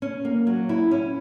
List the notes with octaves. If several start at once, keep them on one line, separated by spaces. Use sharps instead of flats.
C#4
A#3
F#3
E4
C#4